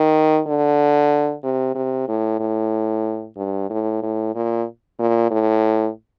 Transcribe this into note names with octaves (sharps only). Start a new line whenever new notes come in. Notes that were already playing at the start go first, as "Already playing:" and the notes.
Already playing: D#3
D3
C3
C3
A2
A2
G2
A2
A2
A#2
A#2
A2